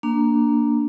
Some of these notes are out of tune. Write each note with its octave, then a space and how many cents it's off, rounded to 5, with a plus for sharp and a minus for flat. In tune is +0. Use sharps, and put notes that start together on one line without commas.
A#3 +0 D4 +0